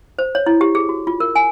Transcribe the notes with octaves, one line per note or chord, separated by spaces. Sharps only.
C5
C#5
E4
G4
G#4
F#4
F4
A#4
G#5